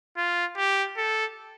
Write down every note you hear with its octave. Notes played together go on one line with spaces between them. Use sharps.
F4
G4
A4